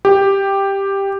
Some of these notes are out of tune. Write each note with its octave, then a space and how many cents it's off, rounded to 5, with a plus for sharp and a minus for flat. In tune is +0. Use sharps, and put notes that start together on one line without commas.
G4 +5